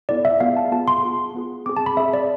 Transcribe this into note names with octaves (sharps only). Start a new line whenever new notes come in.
B3 E4 A4 D5
E5
B3 F4 G#4 F5
A5
B3 F4 G#4 A5
C6
B3 F4 G#4
B3 F4 G#4
C4 G#4 D6
A5
B5
C4 G#4 E5
D5